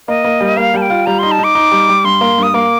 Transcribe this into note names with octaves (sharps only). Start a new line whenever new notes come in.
A#3 D#5
A#3
G3
A#3 F5
G3 A5
G5
F4
G3 A#5
D#4 C6
A5
D#4 D6
D#4
G3
G3
G2 C6
A#3
G2 D#6
A#3 D6